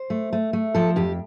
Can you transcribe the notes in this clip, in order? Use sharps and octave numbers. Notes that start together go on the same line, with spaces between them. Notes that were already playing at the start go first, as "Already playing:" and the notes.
Already playing: C5
A3
A3
A3
F3 A4
F2 G4